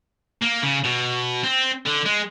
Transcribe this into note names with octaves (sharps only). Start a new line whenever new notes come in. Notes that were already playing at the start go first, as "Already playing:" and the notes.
A#3
C#3
B2
C4
D3
G#3